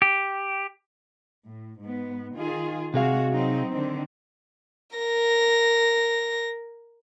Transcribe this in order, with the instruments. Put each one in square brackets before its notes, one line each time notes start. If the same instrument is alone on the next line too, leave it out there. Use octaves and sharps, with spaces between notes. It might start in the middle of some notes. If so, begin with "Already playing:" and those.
[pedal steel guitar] G4
[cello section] A2
G#2 B3
D#3 F4 G#4
[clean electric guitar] C3 G#4 F5 [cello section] G#3 F#4
[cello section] F#3 C4 D#4
D3 D#3 C4
[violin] A#4 A#6